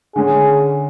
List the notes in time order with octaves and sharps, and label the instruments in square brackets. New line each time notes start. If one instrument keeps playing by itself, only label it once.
[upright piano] D3 G#3 C#4 [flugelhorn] G#4